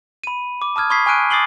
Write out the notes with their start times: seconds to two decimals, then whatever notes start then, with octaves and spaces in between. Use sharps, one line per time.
0.24 B5 D#7
0.62 D6
0.76 A5 D#6 F6 G#6
0.90 B5 C#6 D#6 G#6 B6 C7
1.06 G#5 C#6 F6 F#6 D7 D#7
1.30 D6 D#6 A6 C7 F#7 G7